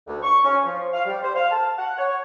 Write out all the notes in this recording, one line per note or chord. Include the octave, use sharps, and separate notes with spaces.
D2
C#6
C#4
F3
F5
G3
C5
F5
A5
F#5
C#5